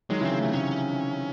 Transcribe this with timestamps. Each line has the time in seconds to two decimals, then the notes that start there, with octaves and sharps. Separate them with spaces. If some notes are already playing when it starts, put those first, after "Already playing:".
0.10 D#3 F#3 G#3
0.20 C#3 E3
0.24 C4
0.32 C#3
0.39 C3 A3
0.53 C#3 C#4